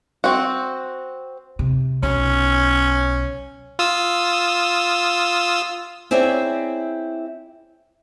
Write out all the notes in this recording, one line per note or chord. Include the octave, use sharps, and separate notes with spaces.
C4 F#4
C3
B1 C#4
F4 D#6 E6
C4 E4 G#4 C#5 D5 E5